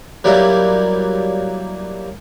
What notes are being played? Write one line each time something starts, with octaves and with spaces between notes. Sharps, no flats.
F#3 G3 A#3 E4